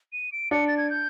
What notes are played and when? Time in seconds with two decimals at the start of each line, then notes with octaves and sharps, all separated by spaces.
0.13 D#7
0.32 D7
0.51 D4 C#7
0.68 A6
0.78 G#6
0.90 G6